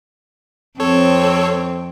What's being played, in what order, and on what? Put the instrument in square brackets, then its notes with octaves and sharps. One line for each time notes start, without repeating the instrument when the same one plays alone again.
[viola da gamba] F2 C4 [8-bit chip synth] A4 C#5